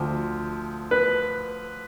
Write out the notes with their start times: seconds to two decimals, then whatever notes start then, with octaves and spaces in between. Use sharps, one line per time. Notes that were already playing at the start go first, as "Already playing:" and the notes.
Already playing: D2 F3
0.91 B4